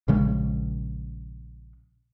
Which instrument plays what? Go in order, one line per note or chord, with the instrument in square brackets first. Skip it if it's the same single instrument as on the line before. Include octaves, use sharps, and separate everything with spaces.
[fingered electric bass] A#1 C#3 G#3